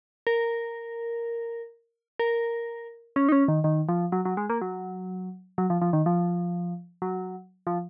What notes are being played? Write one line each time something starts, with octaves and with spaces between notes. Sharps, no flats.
A#4
A#4
C#4
D#4
C#4
D#3
D#3
F3
F#3
F#3
G#3
A#3
F#3
F#3
F3
F3
D#3
F3
F#3
F3